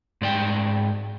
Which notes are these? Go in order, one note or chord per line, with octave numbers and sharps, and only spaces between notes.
G#2 D5 G5